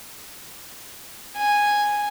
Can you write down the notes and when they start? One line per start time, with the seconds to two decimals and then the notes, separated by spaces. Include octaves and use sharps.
1.37 G#5